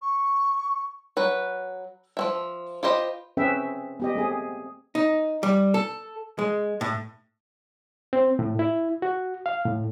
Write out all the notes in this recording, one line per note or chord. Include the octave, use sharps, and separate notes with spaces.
C#6
F#3 B4
F3 C4 E5
F4 G4 C5 D#5 B5
C4 C#4 G#4 B4 E5 G5
B3 G4 D#5
A3 C4 G#4
D#4
G3
A4
G#3
A2
C4
A2
E4
F#4
F5
A2